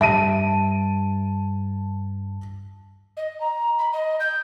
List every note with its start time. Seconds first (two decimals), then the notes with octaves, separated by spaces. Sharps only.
0.01 G2 E5 A5 D7 D#7
3.16 D#5
3.40 A#5
3.78 B5
3.92 D#5
4.20 G6